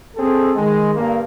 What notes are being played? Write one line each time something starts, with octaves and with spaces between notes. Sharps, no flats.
C4 G#4 A4
D#3 G#3
G2 D3 A#3